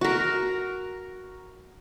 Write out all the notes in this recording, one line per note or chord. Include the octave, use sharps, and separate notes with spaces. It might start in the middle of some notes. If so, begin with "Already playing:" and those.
F#4 A#4